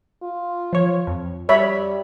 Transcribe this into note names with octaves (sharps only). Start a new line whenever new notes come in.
F4
F3 C#5
F2
G3 C#5 E5 B5